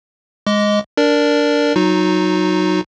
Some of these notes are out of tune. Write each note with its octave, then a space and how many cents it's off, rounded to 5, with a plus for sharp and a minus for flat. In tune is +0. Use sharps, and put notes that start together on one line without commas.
G#3 +0 D#5 +5 D6 -25
D4 -10 A#4 +0 D5 +0
F#3 +0 D#4 +0 F#4 -30